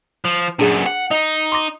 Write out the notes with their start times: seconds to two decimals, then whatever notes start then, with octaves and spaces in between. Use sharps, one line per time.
0.25 F3
0.59 F#2 A#2 D4 G#4
0.86 F#5
1.11 D#4 D#5
1.52 C6 D6 A#6